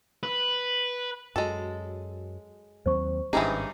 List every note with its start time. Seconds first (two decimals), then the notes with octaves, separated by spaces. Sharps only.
0.23 B4
1.36 F#2 G#3 F#4 A4
2.86 D#2 F#3 C4 C5 C#6
3.33 G#1 G2 E3 C#4 D#4 G4 G#4